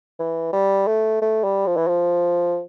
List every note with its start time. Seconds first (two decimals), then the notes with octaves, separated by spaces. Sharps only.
0.19 E3
0.53 G3
0.87 A3
1.21 A3
1.44 G3
1.67 F3
1.76 E3
1.88 F3